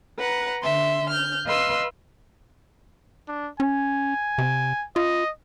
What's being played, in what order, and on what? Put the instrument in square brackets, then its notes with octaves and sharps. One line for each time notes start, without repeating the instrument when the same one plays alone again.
[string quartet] B4 F#5 A#5
D3 E5 C6
F6 G6
B4 D#5 F5 C6 E6
[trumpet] D4
[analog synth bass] C#4 [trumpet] G#5
[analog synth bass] C3
[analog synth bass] F4 [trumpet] D#5